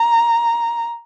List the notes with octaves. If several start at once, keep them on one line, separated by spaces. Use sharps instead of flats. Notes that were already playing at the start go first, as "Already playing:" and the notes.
Already playing: A#5